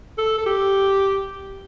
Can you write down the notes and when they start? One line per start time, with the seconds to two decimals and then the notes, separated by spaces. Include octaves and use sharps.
0.18 A4
0.38 A4
0.46 G4